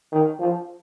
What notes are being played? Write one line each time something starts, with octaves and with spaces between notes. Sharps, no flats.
D#3
F3